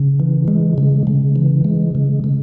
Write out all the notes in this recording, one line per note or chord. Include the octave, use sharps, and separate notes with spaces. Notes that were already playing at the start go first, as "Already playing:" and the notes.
Already playing: C#3
E3
G#3
C#3
C#3
E3
G#3
C#3
C#3